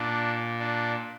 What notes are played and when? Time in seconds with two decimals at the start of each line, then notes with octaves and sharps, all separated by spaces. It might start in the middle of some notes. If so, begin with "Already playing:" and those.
Already playing: A#2 D4
0.59 D4